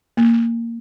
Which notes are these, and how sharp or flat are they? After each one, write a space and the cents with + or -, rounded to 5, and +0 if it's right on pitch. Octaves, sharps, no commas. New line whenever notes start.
A#3 -10